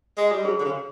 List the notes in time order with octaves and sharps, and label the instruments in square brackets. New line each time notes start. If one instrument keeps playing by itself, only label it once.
[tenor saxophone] G#3
G3
[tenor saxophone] F#3 [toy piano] G#4
[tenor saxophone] D3
C#3